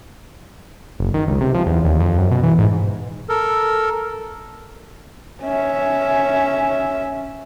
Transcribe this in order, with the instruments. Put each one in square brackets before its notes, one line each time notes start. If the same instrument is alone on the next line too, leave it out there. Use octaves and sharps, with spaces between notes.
[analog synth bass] F#1
D#3
C#2
C3
F3
E2
D#2
F2
F#2
B2
E3
G#2
[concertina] A4 A#4
[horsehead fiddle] C#4 E5